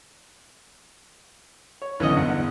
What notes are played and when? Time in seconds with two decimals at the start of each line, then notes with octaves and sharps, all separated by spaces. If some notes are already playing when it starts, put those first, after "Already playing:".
1.82 C#5
2.00 B1 D3 E3 B3 C#4 D#5
2.16 G1 E2 F#5